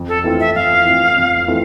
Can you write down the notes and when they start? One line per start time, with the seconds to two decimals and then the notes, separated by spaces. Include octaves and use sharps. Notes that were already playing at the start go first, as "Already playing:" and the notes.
Already playing: F2
0.08 A4
0.24 E3 A3 C4 F4
0.40 E5
0.55 F2 F5
0.85 E3 A3 C4 F4
1.17 F2
1.48 E3 A3 C4 F4